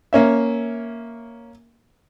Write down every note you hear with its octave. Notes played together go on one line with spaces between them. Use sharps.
A#3 C#4 E5